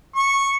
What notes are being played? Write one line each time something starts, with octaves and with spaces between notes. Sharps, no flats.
C#6